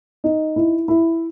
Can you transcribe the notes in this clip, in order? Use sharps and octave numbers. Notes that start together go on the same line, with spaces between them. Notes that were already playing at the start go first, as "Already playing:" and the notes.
D#4
E4
E4